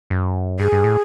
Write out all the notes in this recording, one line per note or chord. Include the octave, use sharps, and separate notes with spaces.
F#2
G2 G#4
G2
A2